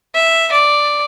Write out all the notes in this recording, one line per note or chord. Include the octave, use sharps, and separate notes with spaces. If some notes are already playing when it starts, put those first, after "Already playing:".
E5
D5